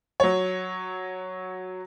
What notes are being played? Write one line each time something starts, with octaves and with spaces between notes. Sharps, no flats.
F#3 C#5